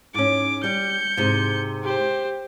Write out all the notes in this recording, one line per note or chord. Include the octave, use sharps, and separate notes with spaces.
G#2 C#4 D6
G3 G6 C#7
G#2 C3
G4 C5